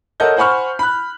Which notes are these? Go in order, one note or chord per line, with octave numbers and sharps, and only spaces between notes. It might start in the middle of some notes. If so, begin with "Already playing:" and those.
A4 A#4 C#5 D#5 F#5 G6
C5 F#5 G#5 B5 C#6 F6
B5 F#6